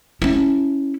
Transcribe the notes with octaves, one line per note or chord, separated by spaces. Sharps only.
C#4 E4